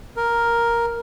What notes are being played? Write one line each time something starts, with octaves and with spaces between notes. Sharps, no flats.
A#4